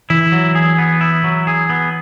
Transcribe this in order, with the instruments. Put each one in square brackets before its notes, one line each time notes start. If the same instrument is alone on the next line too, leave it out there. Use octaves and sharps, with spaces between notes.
[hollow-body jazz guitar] E3 [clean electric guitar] E4
[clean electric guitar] F#3
G#4
B3
E4
F#3
G#4
B3